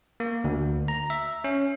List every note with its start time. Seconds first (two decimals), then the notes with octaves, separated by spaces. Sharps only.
0.20 A#3
0.44 D2
0.88 A#5
1.10 E5
1.44 C#4